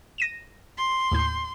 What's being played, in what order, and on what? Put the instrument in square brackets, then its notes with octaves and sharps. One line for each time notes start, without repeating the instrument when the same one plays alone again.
[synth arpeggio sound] A#6 D#7 E7
[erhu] C6
[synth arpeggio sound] D#2 A2 G6